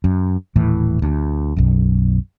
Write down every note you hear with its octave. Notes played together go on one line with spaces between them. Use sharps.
F#2
D#1 A2 E3
D2
B1 F#2